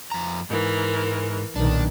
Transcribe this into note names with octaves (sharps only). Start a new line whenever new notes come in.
F2 A#5
G#2 E3 A#4
B1 A#2 D#3 D4